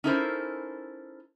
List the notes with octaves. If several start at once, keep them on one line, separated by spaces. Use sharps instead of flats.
C#4 D#4 E4 A4 A#4 C5